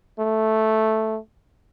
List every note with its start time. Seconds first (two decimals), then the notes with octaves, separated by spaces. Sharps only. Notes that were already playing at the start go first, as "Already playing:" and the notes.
0.19 A3